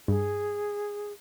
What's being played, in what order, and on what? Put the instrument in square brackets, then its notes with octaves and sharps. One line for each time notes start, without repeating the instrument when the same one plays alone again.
[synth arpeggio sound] G2 [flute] G#4